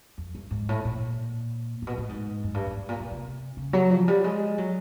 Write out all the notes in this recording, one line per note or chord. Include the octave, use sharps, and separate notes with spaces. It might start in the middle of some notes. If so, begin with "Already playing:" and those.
F2
G2
G#2
A2
A#2
A#2
B2
A2
G#2
F#2
G2
G#2
A2
A#2
A#2
C3
C#3
F#3
F3
G3
G#3
F#3